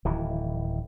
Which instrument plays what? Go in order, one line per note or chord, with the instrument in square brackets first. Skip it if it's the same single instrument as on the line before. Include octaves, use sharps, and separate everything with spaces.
[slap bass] D1 D#3 E3